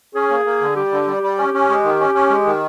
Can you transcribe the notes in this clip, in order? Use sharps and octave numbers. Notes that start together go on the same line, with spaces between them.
C#4 G#4
A#3
A#3
D3
G3 G4
D3
G3
G3
C#4
C#4
G#3
D#3
C#4
C#4
G#3
D#3